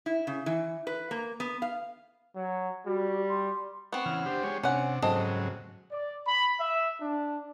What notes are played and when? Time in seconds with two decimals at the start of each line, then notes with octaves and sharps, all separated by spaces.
0.06 E4
0.27 C#3
0.46 E3
0.87 B4
1.11 A#3
1.40 B3
1.62 F5
2.35 F#3
2.86 G3 F#4
3.30 C6
3.93 B3 C4 C#6
4.06 C#3 E3 F6
4.26 D4 G4 C5
4.43 G#3 G4 C#5
4.63 C3 C#4 D4 F#5
5.02 G#2 C#3 F#3 C4 A4 D#5
5.92 D5
6.27 B5
6.60 E5
7.01 D4